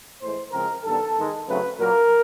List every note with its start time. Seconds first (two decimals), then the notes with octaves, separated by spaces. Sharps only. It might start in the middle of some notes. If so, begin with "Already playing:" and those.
0.21 A2 E3 G#3 C5
0.52 C#3 F3 G#3 C4 A#4
0.84 G2 D#3 G3 B3 A4
1.17 G#2 D#3 G#3
1.48 F#2 C#3 F#3 A3 C4 B4
1.80 A#2 F#3 A#3 A#4